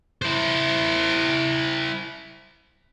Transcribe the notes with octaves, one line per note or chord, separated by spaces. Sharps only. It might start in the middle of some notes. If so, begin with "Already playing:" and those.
E4 C5